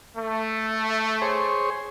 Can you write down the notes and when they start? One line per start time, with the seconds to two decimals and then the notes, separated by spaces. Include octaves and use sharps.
0.18 A3
1.22 G#4 C5 C#5